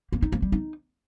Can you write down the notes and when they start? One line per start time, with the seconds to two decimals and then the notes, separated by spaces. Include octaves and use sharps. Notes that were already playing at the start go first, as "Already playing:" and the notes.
0.12 A#3
0.22 D#4
0.32 A#3
0.42 G3
0.52 D#4